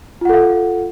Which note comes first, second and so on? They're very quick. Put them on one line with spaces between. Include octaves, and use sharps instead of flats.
F4 F#5 A4 F5